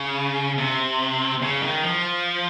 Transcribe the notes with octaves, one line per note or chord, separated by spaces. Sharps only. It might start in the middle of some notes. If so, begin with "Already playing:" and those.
Already playing: C#3
C3
C#3
D#3
F3